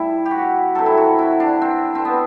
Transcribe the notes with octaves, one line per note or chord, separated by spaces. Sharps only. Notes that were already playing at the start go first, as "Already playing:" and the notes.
Already playing: A2 G3 E4
G4
F#4
C3 F#3 A4
E4
F#4
E4
D4
C4
C4
B3